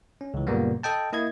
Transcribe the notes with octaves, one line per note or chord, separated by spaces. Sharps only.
C#4
C#2 E3
F#2 A#2 C#3 G3 A#3 B3
A4 D#5 G5 A5
A#3 E4 D#5 G#6